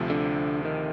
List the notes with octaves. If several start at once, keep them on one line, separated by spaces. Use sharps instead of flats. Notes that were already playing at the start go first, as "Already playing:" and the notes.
Already playing: D2 C3 F3 A3
D3
D#3